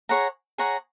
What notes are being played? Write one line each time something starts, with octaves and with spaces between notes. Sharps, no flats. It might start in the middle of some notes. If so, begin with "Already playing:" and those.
G#4 C#5 F#5 A#5
G#4 C#5 F#5 A#5